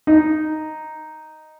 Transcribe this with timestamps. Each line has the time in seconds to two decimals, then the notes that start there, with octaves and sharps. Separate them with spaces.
0.07 D#4